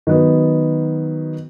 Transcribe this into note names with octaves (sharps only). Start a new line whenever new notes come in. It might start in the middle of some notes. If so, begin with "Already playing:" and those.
D#3 F#3 B3